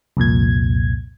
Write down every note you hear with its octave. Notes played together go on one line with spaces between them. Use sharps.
C2 F2 A#2 G#6